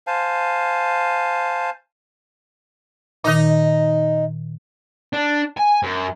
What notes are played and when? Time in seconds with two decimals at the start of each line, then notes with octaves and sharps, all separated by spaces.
0.07 C5 F5 G#5 A5
3.24 A#2 D#3 D#4 D#5
5.13 D4
5.57 G#5
5.83 F#2